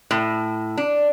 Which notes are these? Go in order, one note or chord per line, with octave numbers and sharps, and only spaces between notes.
A2
D4